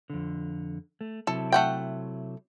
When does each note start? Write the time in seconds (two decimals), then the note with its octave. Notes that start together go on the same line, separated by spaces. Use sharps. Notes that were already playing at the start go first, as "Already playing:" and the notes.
0.10 F2 D3
1.01 A3
1.27 C3 F#3 E4 A4
1.52 A3 F#5 G5